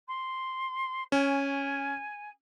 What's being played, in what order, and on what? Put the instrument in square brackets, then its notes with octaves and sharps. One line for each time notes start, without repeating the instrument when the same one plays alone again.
[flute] C6
[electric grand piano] C#4 [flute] G#5